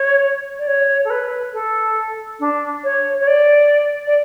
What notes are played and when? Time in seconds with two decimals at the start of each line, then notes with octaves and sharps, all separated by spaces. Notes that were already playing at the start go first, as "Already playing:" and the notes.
Already playing: C#5
0.59 D5
0.67 C#5
1.05 A4
1.10 B4
1.53 A4
2.40 D4
2.84 C#5
3.20 C#5
3.27 D5
4.07 D5